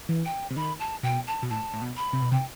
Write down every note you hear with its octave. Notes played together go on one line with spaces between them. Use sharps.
E3
G5
C3
D#3 B5
A5
B2 G5
A5
B2
A2 A5
A2
B2
B5
C3
B2
C3 G5